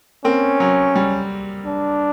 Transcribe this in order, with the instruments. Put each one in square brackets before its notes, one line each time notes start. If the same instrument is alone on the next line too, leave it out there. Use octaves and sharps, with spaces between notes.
[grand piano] A#3 C4 [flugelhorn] C#4
[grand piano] F#3
G3
[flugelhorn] D4